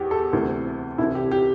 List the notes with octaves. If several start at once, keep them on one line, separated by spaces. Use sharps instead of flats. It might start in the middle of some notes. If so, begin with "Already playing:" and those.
Already playing: E2 E3 G4
A4
D2 C3 E3
C2 C3 E3 E4
G4
G4